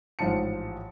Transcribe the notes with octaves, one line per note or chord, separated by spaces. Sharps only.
A1 G#2 F3 A5 C#7